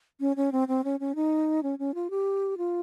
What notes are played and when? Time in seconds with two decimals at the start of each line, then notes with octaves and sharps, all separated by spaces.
0.20 C#4
0.36 C#4
0.52 C4
0.68 C4
0.84 C#4
1.00 C#4
1.15 D#4
1.63 C#4
1.79 C#4
1.95 F4
2.10 G4
2.58 F4